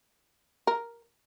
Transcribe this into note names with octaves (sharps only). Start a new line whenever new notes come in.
A#4